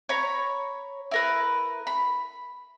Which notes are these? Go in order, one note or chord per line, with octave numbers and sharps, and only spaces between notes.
C#5 A#5 B5
E4 A#4 B4
B5